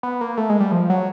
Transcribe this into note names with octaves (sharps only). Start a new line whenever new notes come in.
B3
A#3
A3
G#3
G3
F3
F#3